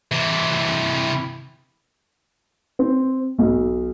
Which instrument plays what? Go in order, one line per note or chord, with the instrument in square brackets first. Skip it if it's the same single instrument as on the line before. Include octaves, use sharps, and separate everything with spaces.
[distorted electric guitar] C3 E3
[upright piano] C4
B1